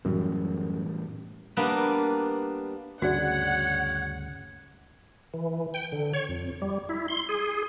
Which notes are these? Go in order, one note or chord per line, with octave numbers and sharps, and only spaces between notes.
F#2 A2 E3 G3
G3 A#3 B3 D4
D2 G2 C#3 F#4 C#5 D5 F#5
E3
G5
D3
C#5
F2
G3
E4
C6
G#4